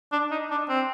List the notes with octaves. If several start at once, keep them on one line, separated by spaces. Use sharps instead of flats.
D4
D#4
D4
C4